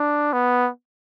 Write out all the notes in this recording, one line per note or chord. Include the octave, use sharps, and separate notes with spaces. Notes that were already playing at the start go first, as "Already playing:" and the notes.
Already playing: D4
B3